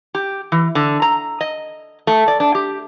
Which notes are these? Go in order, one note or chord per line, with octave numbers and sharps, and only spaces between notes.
G4
E3
D3
A#5
D#5
A3
D5
D4
G4